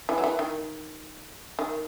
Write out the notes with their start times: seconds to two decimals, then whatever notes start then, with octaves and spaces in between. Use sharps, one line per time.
0.09 E3
0.18 F#3
0.24 E3
0.39 D#3
1.59 D#3